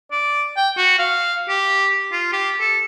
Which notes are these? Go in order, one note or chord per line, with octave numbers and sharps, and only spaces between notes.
D5
G5
F#4
F5
G4
F4
G4
A4